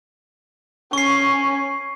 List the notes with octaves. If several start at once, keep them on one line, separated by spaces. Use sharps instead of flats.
C#4 C#6 C7